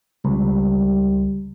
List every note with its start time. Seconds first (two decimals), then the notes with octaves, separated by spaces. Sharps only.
0.25 C#2 G3